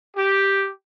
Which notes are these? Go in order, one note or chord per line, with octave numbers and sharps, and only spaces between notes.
G4